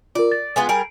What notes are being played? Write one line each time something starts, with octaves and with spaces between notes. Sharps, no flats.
F4 A#4 D5
A6
G#3 B3 F4
G3 G#4 A#4 D7